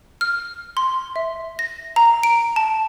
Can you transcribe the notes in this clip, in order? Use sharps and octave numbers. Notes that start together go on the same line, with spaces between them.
F6
C6
E5
A#6
A#5
D7
A5